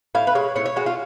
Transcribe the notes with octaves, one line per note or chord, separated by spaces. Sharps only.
A2 F5
B4
G#3 C#5
A2 C#5
C#5
G#3 F#4
F4